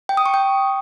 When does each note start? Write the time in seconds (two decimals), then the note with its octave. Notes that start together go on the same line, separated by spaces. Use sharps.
0.09 G5
0.17 D#6
0.26 C#6
0.34 G5